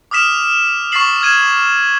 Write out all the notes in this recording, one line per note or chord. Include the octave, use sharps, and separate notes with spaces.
D6 D#6 F6 B6 E7
C#6 E6 A6 B6 C7 F#7
F6 G#6 D#7 E7